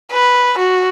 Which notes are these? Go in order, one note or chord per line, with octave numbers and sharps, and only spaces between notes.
B4
F#4